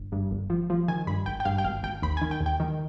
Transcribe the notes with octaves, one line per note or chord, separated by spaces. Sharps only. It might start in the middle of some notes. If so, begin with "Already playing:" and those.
Already playing: G1
G2
G1
F3
F3
D#3 G#5
G2 B5
G#1 G5
G5
G2 F5
G5
G#1 F5
G#1 G5
D#2 B5
G#5
D#3
G5
D#2
G5
D#3